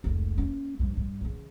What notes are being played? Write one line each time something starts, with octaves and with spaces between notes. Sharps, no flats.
F1 C#2
A#3 C#4
G2 F3
G2
C#3 E3